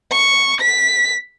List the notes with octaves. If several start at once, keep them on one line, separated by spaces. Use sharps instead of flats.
C#6
B6